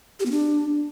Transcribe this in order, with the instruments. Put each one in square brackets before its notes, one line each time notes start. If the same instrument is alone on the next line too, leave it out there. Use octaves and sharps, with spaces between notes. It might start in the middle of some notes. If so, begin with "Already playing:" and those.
[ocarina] G4
B3
D4